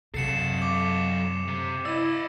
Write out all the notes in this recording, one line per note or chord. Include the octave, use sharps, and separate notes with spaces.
F#2 C3 F#3 A4 C7 C#7 E7
D6
C3
E4 D5 D#5 E6